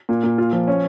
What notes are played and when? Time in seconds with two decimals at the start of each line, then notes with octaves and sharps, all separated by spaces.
0.09 A#2
0.24 A#2
0.38 F4
0.53 F3
0.68 C#4